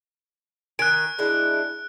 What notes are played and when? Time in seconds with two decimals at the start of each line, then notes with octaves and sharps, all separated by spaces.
0.79 D#3 G#5 F#6 D7
1.19 G#3 D4 E4